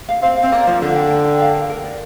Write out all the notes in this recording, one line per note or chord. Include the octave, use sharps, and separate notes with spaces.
F5
C4 F5
F5
C4
A#3 D5
F3 F4
D3 F4
G5
G5
G5
F5
A#4
A#4
D5